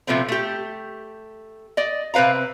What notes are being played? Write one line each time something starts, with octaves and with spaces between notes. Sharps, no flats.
C3 F3 A3 B3 C4
A3 G4
D5 D#5
C3 C4 B4 F5 A#5